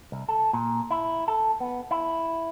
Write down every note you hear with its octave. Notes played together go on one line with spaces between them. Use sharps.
C2
A4
A#2
E4
A4
B3
E4